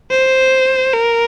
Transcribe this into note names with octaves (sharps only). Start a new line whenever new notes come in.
C5
A#4